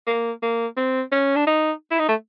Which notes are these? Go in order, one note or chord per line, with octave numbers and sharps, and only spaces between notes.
A#3
A#3
C4
C#4
D4
D#4
E4
D#4
A3